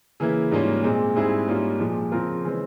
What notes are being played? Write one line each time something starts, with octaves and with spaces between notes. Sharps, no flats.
C#3 E3 A#3 E4
G#2 G3 A#3 C#4 F4
A#2 G#3 C4
G#2 G3 C4 E4 G#4
G#2 G3 A#3 C#4 F4
A#2 F3 G#3
C#3 F3 C4 F4 A#4
C#3 E3 G#3 C4